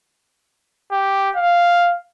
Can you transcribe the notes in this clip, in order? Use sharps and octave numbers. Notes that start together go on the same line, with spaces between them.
G4
F5